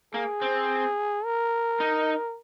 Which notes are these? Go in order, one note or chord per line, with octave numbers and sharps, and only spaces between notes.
A#3 G#4
C4
A#4
D#4